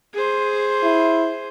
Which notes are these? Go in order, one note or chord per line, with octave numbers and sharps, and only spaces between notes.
G#4 C5
E4